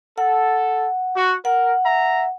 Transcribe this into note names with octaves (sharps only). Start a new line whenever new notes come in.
A4 F#5
F#4
A#4 F#5
E5 A#5